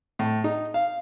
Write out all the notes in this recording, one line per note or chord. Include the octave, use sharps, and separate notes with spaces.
A2
D#4
F5